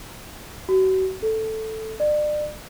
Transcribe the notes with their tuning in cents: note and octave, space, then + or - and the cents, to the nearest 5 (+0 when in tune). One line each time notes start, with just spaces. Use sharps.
F#4 +35
A4 +0
D5 +35